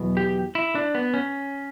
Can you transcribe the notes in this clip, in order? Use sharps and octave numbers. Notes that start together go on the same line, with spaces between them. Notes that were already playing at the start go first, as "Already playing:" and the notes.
Already playing: E2 B2 F#3 B3
G4
E4
D4
B3
C#4